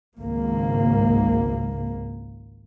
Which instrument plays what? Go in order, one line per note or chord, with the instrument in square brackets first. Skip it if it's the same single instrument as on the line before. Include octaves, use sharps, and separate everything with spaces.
[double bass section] G#1 C#2 A#3